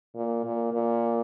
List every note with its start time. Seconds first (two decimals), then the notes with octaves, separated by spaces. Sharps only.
0.16 A#2
0.45 A#2
0.74 A#2